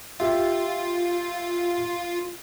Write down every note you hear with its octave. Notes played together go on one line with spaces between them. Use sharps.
F4 G4 E5